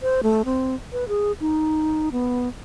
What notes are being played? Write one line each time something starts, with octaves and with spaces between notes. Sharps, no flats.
C5
A3
C4
B4
G#4
D#4
B3